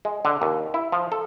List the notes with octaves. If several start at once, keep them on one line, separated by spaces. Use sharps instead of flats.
G#3
D3
D#2
E4
F3
A4